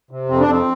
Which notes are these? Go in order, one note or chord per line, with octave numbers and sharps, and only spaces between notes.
C3
F2 C4
D4
F2 C4